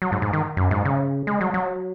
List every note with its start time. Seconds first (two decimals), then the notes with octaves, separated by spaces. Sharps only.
0.02 F#3
0.12 G#2
0.22 G#2
0.33 D#3
0.57 F#2
0.71 G#2
0.85 C#3
1.27 G#3
1.41 F#3
1.54 F#3